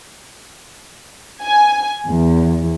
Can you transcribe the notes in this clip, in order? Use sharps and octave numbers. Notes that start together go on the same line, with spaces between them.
G#5
E2